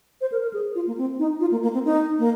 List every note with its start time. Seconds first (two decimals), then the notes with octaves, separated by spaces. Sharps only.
0.21 C5
0.32 A#4
0.42 A#4
0.53 G#4
0.75 F4
0.87 A#3
0.98 C4
1.19 D#4
1.40 F4
1.51 A#3
1.63 A#3
1.74 C4
1.85 D#4
2.19 A#3